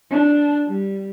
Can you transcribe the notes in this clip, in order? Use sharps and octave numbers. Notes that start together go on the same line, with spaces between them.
D4
G3